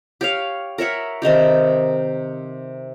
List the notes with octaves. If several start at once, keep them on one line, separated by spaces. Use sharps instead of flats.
G4 C#5 F5
A#4 C#5 E5 F#5
C3 D#3 D#4 G4